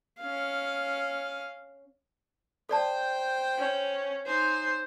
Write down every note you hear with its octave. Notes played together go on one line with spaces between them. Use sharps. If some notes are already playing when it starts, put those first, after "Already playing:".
C#4 F5
A4 C5 D5 G5 A5
C#4
D#4 C5 G#5